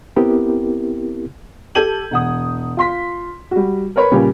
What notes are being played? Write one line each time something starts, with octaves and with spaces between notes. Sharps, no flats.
B3 C4 E4 G4 A#4
G4 A4 G6 G#6 D#7 F#7
E1 F#5 D#6
F4 C6 B6
G3 F#4
A#4 B4 C#5 B5
A#2 C#3 G3 C#4 G4